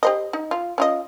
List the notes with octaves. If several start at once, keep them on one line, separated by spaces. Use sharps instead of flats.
G4 C5 D#5
D#4
F4
C#4 F4 D#5